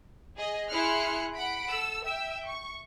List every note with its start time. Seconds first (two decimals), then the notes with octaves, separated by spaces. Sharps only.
0.37 G#4 D#5
0.70 E4 G#4 C6 F6 F#6 C#7
1.37 F#5 B5 D7
1.68 A4 E6
2.04 E5 G5 E6
2.46 C#6